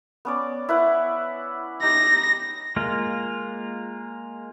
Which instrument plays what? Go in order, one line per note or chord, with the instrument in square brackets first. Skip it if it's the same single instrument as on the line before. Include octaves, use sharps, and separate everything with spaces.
[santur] B3 C#4 D5
E4 B4 F#5
[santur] D#4 G4 [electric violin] A#6
[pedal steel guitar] G#3 A#3 F4